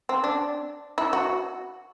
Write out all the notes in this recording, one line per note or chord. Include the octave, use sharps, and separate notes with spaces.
C4
D4
E4
F#4